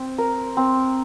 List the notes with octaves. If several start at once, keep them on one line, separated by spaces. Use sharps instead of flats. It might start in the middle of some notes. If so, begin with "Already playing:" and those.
Already playing: C4
A#4
C4